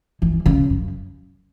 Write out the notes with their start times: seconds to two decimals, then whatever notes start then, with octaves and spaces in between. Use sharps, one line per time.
0.22 E3
0.46 C#3
0.70 F#2